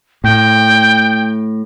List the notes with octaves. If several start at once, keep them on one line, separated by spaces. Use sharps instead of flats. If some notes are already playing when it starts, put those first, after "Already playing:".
A2 G5